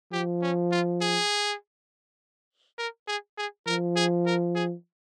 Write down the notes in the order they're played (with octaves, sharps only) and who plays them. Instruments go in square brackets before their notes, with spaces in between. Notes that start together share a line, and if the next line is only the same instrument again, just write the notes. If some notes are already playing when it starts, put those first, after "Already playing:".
[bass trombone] F3 [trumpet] G4
[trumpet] C#4
F4
G#4
A#4
G#4
G#4
[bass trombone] F3 [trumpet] A#4
[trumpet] G#4
A#4
G#4